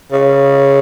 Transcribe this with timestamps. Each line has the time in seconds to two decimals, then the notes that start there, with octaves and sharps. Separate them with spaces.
0.12 C#3